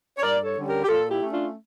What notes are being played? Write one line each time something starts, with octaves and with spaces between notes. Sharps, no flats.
C#5
G2 A#4 D5
A4 C#5
D3 G3 C#4
G4 A#4
G4
A#2 F4 A4
E4 G4
A3 C#4
D4 F4